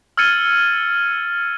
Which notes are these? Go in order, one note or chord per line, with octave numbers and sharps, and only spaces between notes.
E6 F6 G#6 A6 C#7 D#7